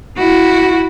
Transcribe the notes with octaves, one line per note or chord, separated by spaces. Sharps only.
E4 F#4